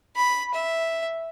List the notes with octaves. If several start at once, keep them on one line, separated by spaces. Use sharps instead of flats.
B5
E5